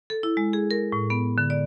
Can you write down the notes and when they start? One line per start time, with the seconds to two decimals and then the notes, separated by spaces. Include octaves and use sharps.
0.10 A4
0.23 E4
0.37 G#3
0.53 G#4
0.71 A#4
0.92 A2
1.10 B3
1.38 D3
1.50 D5